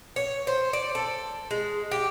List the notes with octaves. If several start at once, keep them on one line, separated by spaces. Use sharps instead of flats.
C#5
C5
D5
A4
G#3
G4